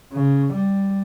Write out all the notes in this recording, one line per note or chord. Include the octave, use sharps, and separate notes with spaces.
C#3
G3